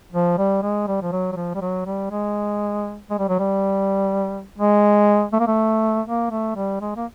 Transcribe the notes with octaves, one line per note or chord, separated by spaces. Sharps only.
F3
G3
G#3
G3
F3
F#3
F#3
F3
G3
F#3
G3
G#3
G#3
G3
F#3
G3
G#3
A3
A#3
A3
A#3
A3
G3
G#3
A#3